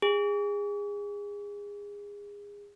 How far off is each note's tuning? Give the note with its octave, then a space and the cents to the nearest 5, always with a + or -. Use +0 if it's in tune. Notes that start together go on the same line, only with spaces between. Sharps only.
G#4 -25